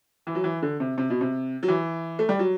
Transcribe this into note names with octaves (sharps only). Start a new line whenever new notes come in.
E3
F#3
E3
D3
C3
C3
B2
C3
F#3
E3
A3
G3
F#3